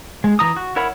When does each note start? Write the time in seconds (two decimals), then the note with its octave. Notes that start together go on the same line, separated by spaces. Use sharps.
0.24 G#3
0.39 E3 A#5 D#6
0.57 F#4
0.76 E4 A#4 C#5 F#5 B5